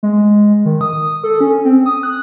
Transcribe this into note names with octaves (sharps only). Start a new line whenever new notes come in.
G#3
D#3
D#6
A4
C#4
C4
D#6
F#6